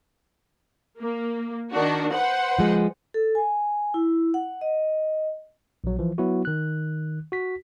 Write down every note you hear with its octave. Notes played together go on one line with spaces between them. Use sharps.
A#3
D#3 D4 F#4
B4 C5 F#5
F3 G#3
A4
G#5
E4
F#5
D#5
A#1 F#3
E3 F3
F#3 B3 E4 F#4
D#3 F#6
F#4 B6